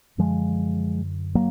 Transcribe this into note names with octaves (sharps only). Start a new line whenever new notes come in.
F#2 D3 F3 G#3
F#3 A#3